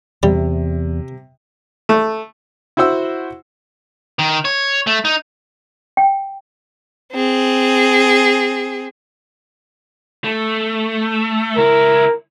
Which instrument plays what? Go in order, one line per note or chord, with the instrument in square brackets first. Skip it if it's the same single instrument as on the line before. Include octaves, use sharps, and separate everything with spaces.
[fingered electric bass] E2 [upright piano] C3 [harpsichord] G3
[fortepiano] A3
E4 F#4 C5 F#5 E6
[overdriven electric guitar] D#3
C#5
A3
D#4
[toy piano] G5
[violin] C4 G#4
[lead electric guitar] A3
[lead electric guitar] C#2 E4 [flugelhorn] A#4